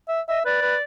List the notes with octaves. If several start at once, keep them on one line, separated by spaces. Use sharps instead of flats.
E5
D#5 E5
B4 D5
B4